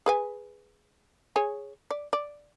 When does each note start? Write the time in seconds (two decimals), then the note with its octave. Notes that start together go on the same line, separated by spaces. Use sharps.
0.06 G#4 B4 G#5
1.36 G#4 C#5 G#5
1.91 D5
2.13 D5